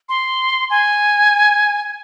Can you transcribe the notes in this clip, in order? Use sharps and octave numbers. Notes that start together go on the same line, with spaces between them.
C6
G#5